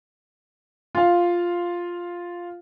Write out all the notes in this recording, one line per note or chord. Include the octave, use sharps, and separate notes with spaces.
F4 F5